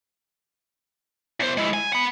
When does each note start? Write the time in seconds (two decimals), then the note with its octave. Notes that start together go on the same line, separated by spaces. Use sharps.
1.40 E2 C5
1.57 G#3 E4
1.74 G#5
1.93 F#5 B5